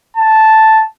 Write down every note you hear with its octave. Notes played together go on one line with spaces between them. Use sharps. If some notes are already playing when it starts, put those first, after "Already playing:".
A5